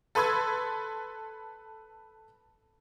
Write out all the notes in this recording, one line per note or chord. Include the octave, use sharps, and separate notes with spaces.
A4 B4 B5 C6 E6 G#6